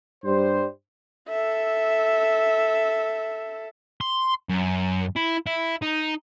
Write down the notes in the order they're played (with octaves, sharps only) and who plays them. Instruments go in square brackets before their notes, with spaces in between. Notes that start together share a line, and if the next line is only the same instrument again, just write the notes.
[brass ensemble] G2 G3 C5
[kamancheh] A4 E5
[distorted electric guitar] C6
F#2
E4
E4
D#4